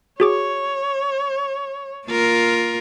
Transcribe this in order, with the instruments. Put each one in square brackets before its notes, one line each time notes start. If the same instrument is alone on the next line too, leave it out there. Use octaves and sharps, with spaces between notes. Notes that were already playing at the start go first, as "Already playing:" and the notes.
[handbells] F#4 G#4 D6 [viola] C#5
[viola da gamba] A#3 F4 A#4